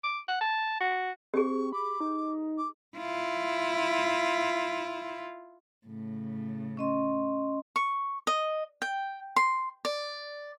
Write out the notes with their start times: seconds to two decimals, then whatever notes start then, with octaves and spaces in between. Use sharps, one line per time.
0.04 D6
0.28 F#5
0.41 A5
0.81 F#4
1.34 C4 G4 G#4 C#6
1.72 B5 D6
2.00 D#4
2.57 D6
2.97 E4 F4
5.86 A2 C#3
6.77 C#4 D#5 C6
7.76 C#6
8.27 D#5
8.82 G5
9.36 C6
9.85 D5